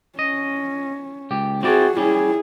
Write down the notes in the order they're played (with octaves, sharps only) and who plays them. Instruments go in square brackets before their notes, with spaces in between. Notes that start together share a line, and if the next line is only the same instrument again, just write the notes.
[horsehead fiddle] C#4 [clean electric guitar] D#5
[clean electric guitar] C#2 G4
[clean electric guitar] C4 E4 D5 [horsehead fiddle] F#4 G#4
[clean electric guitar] G3 C#4 [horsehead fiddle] E4 G#4